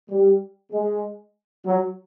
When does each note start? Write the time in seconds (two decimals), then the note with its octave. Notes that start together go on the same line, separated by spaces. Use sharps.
0.10 G3
0.73 G#3
1.66 F#3